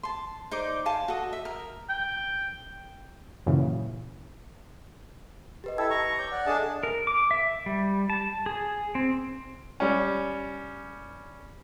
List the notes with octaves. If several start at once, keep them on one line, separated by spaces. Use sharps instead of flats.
A5 C6
D#4 C5 D5 D6
F5 G#5 A5 C6
F#4 A4 D#5
E5
A#4
G5
F#2 A#2 C#3 E3
G4 B4 D#5
E4 A4 G5 E6 G#6
A#5 C#6
C#5 D6 G6
D5 F#5
D4 G#4 A4 D#5 E5 A5
A#4
D6
E5
G3
A5
G#4
C4
G3 C#4